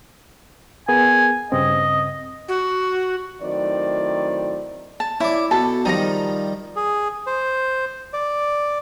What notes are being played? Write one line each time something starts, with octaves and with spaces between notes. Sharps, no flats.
B3 G#4 A#4 G#5
G2 C#3 C4 D#5
F#4
A2 D#3 F#3 C4 D5
A5
E4 C#5 D5
B2 A4 A5 B5
D#3 F3 G3 D#4 A#5
G#4
C5
D5